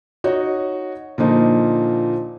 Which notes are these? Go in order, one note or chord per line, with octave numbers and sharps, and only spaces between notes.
D#4 F#4 C#5 D#5
A#2 D3 F3 D#4